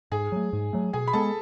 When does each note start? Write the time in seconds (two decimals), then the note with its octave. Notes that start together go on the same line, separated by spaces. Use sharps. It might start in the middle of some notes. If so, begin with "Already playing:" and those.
0.11 G#2 G#4 G#5
0.32 F#3 A3
0.53 G#2
0.73 F#3 A3
0.93 B2 G#4 G#5
1.08 B5
1.13 G#3 B3 A4 A5